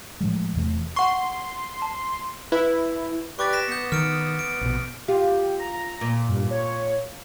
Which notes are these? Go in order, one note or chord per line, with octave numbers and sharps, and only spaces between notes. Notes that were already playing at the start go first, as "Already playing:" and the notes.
A2 F3 G#3
E2 C3 E3 A3
F#5 C6 C#6
A5
E4 B4
G4 B4 D5 C#6 D6 A6
A#6 B6 E7
B3 D#6 G6 C#7
D#3 F6 C#7 D7
D7
A#1 B2
F4 G4
A#5
A#2
G2
C#5